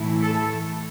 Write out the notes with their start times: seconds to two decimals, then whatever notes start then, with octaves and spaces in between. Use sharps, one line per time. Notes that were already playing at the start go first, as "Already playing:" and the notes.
Already playing: A2 E3 A3 E4
0.22 A4